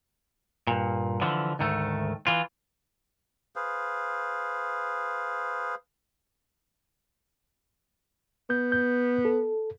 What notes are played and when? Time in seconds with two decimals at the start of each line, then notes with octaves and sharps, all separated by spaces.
0.67 G2 A#2
1.21 D3 E3 F3
1.59 D2 G#2 D#3 A3
2.27 E3 F4
3.56 G#4 B4 C5 F5
8.50 B3 G6
8.72 G6
9.25 A4